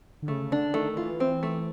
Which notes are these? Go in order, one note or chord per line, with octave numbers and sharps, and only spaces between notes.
D3
C#3 A3
D3 D4
D#3 A3
D#3
E3 F4
C4
A3